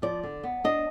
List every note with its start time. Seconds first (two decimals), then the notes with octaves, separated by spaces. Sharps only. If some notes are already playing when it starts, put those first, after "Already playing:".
0.02 F3 D5
0.23 D3
0.44 B3
0.64 D4 D#5